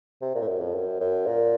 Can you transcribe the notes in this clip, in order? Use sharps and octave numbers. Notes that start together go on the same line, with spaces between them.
C3
A#2
A2
F#2
F2
F#2
F#2
A#2